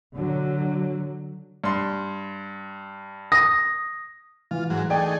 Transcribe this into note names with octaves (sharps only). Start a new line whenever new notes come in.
D3 F#3
G2 C6
D#6 A#6
E3 F4
G#2 F#3
A3 D#4 G#4 D5 G5